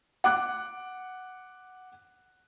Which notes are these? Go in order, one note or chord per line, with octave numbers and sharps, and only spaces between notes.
F#5 D6 F#6